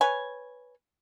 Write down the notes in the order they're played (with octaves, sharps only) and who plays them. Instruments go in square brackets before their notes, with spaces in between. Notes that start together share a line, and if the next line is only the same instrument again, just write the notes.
[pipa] B4 C#5 G#5